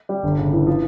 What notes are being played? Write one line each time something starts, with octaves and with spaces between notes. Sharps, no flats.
G3
G1
C#3
E3
F3